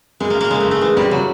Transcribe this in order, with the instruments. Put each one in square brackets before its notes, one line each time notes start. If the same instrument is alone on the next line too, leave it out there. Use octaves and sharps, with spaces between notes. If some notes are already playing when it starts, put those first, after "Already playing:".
[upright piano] F#2 [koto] G#3
[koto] A#3
[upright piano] F#1
[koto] A#3
[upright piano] C#3 [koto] G#3
[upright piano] F#1 [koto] A3
[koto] A3
[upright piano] E3 [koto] G#3
[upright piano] F#2 [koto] G3
[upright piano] C#3 [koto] F#3